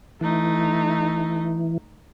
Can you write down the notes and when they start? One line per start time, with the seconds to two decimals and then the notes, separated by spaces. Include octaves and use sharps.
0.21 E3 A3 D#4